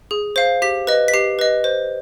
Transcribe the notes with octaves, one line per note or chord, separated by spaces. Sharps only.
G#4
C5 F5
G4 B6
B4 D#5
B6
G4 C7
B4 D#5
C5